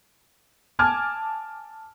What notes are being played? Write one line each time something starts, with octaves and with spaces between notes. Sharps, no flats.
G#5 A5 D6 F6 G#6